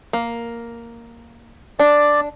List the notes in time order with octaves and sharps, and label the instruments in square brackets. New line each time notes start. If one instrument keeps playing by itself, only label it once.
[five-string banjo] A#3
[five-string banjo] D4 [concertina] D5